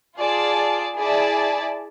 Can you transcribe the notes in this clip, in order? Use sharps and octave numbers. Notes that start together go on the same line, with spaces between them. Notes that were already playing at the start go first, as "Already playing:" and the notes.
F4 G#4 D5 A5
E4 G#4 D5 A5